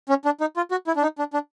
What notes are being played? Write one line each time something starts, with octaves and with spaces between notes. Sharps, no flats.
C#4
D4
D#4
F4
F#4
E4
D4
D#4
D4
D4